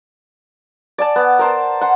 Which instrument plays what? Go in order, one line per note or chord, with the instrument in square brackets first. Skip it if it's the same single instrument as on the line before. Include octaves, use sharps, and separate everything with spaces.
[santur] D5 G#5 A5
B3
A#4 C5 A5
F#5 C6